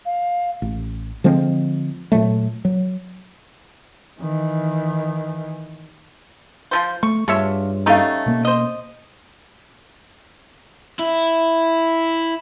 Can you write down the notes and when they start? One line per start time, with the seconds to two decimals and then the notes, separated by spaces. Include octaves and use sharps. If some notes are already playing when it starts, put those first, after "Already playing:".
0.05 F5
0.62 A1
1.24 D3 F3 G#3 C4
2.12 A#2 F#3 A3
2.65 F#3
4.20 D#3 E3
6.71 F3 G3 C5
7.03 A3 C#6
7.28 G2 D4 F4 G#4 C#5 E5
7.86 G3 A3 C#4 D#4 A4 F5
8.26 B2 A#3
8.45 C5 D#5
11.00 E4